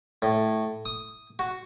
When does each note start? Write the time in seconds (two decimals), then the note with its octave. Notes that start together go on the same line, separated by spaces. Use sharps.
0.22 A2
0.85 D#6
1.39 F#4